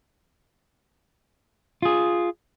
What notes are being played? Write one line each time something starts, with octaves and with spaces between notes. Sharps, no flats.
F4 G#4